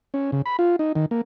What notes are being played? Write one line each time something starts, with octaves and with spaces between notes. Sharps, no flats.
C#4
C#3
B5
F4
D#4
D#3
A#3